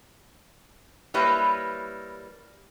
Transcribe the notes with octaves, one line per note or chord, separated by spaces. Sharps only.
G3 A#3 E4 B4 C#5